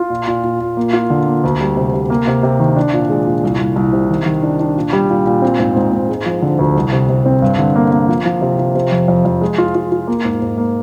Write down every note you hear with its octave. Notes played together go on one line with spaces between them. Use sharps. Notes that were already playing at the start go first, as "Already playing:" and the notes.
Already playing: F4
A#2
A#2
A#2
A#2
A#3
F4
D3
A#3
D2
G3
C3
C3
A#3
C3
C3
D#3
D4
A#2
G#3
A#2
C2
C2
C2
C3
D#3
D#3
D4
D4
A#2
G3
A#2
A#2
C4
G#2
G#2
G#2
G#3
F3
D3
D2
C2
C3
C3
C4
G2
D3
A#3
A#3
F3
F3
C3
F3
C3
F2
F2
F2
G#3
F4
F4
F4
A#3
G#2
G#2
A#3